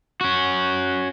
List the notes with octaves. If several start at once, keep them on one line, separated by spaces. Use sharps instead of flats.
C#4 F#4